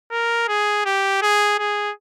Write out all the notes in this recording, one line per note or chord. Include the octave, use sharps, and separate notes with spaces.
A#4
G#4
G4
G#4
G#4